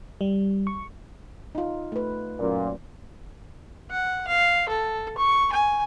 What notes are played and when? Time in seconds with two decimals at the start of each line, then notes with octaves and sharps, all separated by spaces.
0.21 G3
0.67 C#6
1.55 D#4 F4
1.92 A3 B4
2.39 F#2 A#2
3.90 F#5
4.27 F5
4.68 A4
5.18 C#6
5.52 G#5